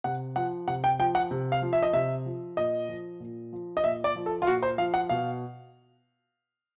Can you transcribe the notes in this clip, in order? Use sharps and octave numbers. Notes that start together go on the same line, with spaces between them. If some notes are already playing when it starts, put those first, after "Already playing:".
C3 F#5
F3 F#5
C3 F#5
G5
F3 G5
F#5
C3
F5
F3
E5
D#5
C3 E5
F3
A#2 D#5
F3
A#2
F3
D#5
A#2 E5
D5
F3
A4
F4
A#2 F#4
C5
F3 F5
F#5
B2 F5